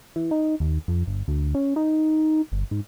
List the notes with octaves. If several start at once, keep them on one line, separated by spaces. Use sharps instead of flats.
E3
D#4
D#2
F2
G1
D2
C#4
D#4
G1
G#2